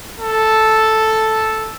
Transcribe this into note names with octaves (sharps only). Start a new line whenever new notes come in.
A4